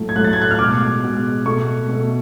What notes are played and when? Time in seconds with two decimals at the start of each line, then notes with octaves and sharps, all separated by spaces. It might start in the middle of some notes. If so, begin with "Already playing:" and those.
Already playing: A2 F#3 A3
0.09 G#6
0.16 A2 F#3 A3 F#6
0.24 A6
0.33 G#6
0.42 F#6
0.51 F6
0.59 B2 G#3 D6
1.03 B2 G#3
1.45 B2 A3 C#6
1.89 B2 A3